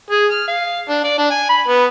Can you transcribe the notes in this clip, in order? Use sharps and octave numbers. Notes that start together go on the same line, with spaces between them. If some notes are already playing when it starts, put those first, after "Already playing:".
G#4
F6
F5
D4
D5
D4
G#5
B5
B3